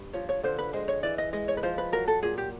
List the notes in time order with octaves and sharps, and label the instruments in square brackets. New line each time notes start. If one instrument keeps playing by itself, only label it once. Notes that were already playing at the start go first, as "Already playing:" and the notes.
Already playing: [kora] G2
[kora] F3 [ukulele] C#5
[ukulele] C#5
[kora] D3 [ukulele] C5
[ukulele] B4
[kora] G#3 [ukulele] C5
[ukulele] C#5
[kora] E3 [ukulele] D5
[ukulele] D#5
[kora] G#3 [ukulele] D#5
[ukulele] C#5
B4
[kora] F3 [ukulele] C5
[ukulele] B4
[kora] F#3 [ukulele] A#4
[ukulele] A4
[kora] A#2 [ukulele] G#4
[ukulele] G4